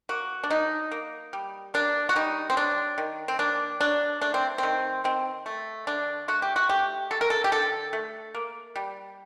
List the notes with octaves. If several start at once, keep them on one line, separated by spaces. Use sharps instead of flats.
A#3 F#4
D4
F#3 D#4
A#3
G3
A#3 D4
F#4
G3 D#4
C4
F#3 D4
D#3
C4
A#3 D4
F#3 D4
A3 D4
C4
D#3 C4
D#3 C4
A3
D3 D4
A3 F#4
G4
F#4
A3 G4
F#3 A4
A#4
A4
G4
D3 A4
A3
A#3
G3